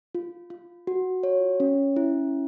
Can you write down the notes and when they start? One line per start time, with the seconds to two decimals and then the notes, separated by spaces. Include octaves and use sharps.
0.15 F4
0.50 F4
0.87 F#4
1.23 C#5
1.60 C#4
1.96 E4